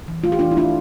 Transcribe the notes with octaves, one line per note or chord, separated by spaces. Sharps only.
E3
A3 F4
G4
E3 D4 F4
E4
A3 D4 F4